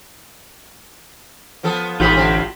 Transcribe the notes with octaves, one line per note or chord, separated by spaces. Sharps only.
F3 B3 A4
A1 G2 B3 F4 G4 B5
A2 D3 C4